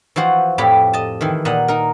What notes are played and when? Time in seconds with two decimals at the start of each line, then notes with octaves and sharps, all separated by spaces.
0.16 E3 F3 F#4 C5
0.58 F2 A2 G4 B5
0.93 D#5 A5
1.21 D#3 E3
1.45 A#2 D#5 F#5
1.68 D#4 A#4